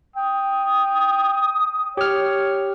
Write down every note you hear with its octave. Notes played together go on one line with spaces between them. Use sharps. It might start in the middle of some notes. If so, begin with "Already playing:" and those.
G5 D#6
G4 C#5 F6